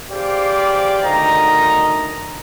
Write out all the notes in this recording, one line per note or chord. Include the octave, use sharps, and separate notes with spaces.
G4 G#4 C5 D5 F5 G5
D2 D#3 D#5 A#5